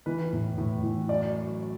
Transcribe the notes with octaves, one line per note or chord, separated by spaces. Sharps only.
E3 B4
A2
A2
E3
F#2 D5
F#3